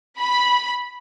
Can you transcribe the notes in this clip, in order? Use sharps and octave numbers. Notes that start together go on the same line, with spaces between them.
B5